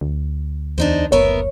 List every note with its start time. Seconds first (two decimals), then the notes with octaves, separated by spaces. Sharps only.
0.01 D2
0.78 E2 D4 D#4 C5
1.12 F#1 B3 A#4 C#5 E5